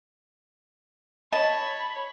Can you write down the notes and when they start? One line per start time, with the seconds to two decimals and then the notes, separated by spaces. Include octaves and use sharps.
1.33 C#5 D#5 A5 B5